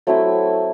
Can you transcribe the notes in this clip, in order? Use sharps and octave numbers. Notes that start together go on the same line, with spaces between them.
F#3 A3 C4 E4